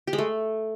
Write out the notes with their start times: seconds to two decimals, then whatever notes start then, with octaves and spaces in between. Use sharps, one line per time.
0.07 G4
0.13 G#3
0.18 A3